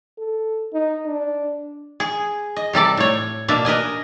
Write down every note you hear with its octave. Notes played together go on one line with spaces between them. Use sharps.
A4
D#4
D4
G#4
D#5
C3 G3 A4 D5
A2 C#5
B2 A#3 D4 E5
A#4 B4 D#5 G#5